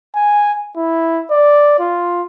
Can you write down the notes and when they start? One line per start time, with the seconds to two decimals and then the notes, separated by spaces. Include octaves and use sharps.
0.16 G#5
0.77 E4
1.31 D5
1.80 F4